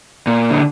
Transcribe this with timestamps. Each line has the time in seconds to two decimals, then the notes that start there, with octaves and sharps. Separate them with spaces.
0.27 A#2
0.51 D3